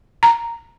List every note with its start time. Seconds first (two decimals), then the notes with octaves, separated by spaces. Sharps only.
0.23 A#5